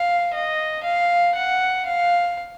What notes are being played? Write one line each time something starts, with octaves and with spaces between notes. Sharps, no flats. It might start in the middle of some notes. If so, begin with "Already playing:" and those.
Already playing: F5
D#5
F5
F#5
F5